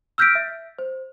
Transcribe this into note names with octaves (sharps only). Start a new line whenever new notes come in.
E6 F6 G6 A#6 B6 D7
E5
C5